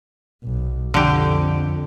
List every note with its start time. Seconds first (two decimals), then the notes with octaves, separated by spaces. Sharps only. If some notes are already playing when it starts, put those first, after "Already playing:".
0.44 B1
0.94 F2 D3 G4